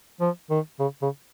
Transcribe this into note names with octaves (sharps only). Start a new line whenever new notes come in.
F3
D#3
C#3
C#3